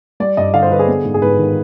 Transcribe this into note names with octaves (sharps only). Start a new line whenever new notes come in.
G3 D5
G2 D#5
D3 F5
C5
D3 B4
G#4
B3
G#2
G#4
G#2 B4
D#3